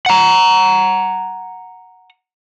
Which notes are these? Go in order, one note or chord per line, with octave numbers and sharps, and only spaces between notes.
F#5 A#5